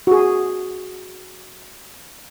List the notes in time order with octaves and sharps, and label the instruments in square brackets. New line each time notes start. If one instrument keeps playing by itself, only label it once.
[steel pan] F#4 G#4